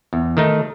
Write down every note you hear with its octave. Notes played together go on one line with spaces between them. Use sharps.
E2
D#3 A3 D#4